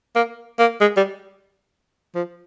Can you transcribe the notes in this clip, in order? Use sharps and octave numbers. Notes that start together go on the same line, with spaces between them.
A#3
A#3
G#3
G3
F3